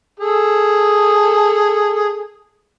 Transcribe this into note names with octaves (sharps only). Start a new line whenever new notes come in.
G#4 A4